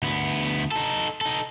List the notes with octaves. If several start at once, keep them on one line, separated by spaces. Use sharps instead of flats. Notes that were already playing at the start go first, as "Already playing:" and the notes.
D2 B3
D#4 A4
D#4 A4